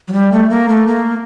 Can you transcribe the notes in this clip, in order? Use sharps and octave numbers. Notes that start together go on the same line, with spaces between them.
F#3
G3
A3
A#3
A3
A#3